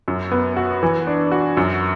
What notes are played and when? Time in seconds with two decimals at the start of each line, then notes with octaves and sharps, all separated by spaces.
0.08 F#2
0.32 B3
0.57 F#4
0.83 E3
1.07 D4
1.31 F#4
1.57 F#2